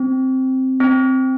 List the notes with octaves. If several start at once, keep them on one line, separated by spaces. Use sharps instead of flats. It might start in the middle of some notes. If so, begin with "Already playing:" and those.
Already playing: C4
C4